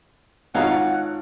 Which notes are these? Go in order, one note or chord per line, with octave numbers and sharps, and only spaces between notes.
G#1 D#4 F4 C#5 F5 F#5 A#5